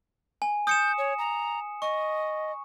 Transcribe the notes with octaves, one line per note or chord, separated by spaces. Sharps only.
G#5
D#6 G6 C#7 E7
C#5
A#5
D#5 C#6